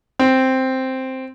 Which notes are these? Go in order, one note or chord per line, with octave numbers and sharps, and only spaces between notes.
C4